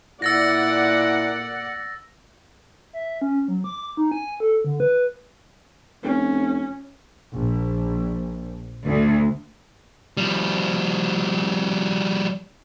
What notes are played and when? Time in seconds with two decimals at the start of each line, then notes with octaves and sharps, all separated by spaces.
0.22 A#2 E4 D5 F#5 E6 A6 A#6
2.93 E5
3.22 C#4
3.48 F#3
3.64 D6
3.97 D#4
4.12 G#5
4.40 A4
4.64 D3
4.80 B4
6.03 F1 C#4
7.34 A#1
8.86 D2
10.17 F3 G3